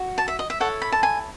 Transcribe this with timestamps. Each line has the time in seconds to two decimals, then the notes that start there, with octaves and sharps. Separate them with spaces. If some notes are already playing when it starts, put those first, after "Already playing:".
Already playing: F#4
0.18 A5
0.28 E5
0.39 D#5
0.50 E5
0.60 E4 A4 C#5 F#5
0.82 B5
0.92 A5
1.03 G#5